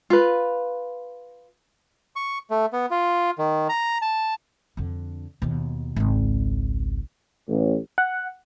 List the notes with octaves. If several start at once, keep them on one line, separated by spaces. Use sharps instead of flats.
F4 B4
C#6
A3
B3
F4
D#3
A#5
A5
F2 D3
D#2 B2
G#1 C#2
A1
F#5